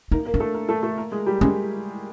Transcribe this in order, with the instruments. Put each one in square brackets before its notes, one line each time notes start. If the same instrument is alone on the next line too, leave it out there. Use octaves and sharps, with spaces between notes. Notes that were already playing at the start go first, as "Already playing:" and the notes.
[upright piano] A#3 A#4 [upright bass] D#4
[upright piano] A#3 A#4
[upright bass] D4
[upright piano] A3 A4
A#3 A#4
A3 A4
A3 A4
A#3 A#4
G#3 G#4
G3 G4
[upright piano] G#3 G#4 [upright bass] C#4